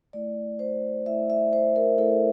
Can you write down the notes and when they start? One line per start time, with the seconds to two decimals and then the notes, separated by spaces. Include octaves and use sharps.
0.13 A3 E4 D5
0.59 C5
1.06 A3 E4 E5
1.30 E5
1.53 C5
1.76 A#4
1.98 A3 E4 A4